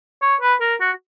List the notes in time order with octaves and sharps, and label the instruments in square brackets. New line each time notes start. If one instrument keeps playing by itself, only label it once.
[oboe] C#5
B4
A#4
F#4